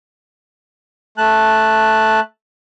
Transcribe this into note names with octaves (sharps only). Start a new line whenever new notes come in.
A3 A5 F#6